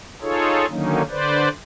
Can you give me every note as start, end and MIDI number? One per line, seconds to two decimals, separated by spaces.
0.22 0.66 63
0.22 0.66 65
0.22 0.66 68
0.22 0.66 69
0.22 0.66 73
0.69 1.02 50
0.69 1.02 51
0.69 1.02 54
0.69 1.02 58
0.69 1.02 61
0.69 1.02 63
1.10 1.49 50
1.10 1.49 71
1.10 1.49 72
1.10 1.49 74